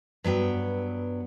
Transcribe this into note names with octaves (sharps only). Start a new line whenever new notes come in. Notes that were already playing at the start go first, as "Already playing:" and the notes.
G2 F#3 B3 G5